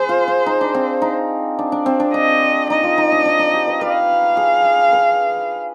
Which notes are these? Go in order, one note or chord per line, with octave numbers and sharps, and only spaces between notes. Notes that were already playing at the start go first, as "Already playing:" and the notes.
Already playing: G#4 C5
F4
F4
D#4
D4
C4
D#4
D4
D4
C4
D4
D4 D#5
D#4 D#5
F4
D#4
D4
D4
D#4
G4
B4
B4 F5
G#4
B4